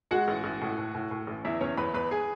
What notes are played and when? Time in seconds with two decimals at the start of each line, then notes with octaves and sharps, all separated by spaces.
0.11 G#3 F#4 F#5
0.28 A1
0.44 A1
0.61 A2
0.78 A2
0.95 A2
1.11 A2
1.27 A1
1.45 E2 E4 E5
1.61 E2 C#4 C#5
1.77 E2 B4 B5
1.94 E2 B4 B5
2.11 G#4 G#5